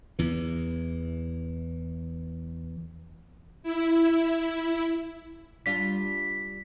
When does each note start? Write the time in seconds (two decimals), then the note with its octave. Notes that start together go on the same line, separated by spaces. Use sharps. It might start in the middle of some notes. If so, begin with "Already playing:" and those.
0.19 E2 E3
3.63 E4
5.66 G3 D4 F4 B6